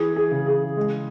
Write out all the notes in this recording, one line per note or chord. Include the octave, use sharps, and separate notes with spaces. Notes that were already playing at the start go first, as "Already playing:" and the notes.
Already playing: E3 G#4
G#4
C#3
G#4
G#3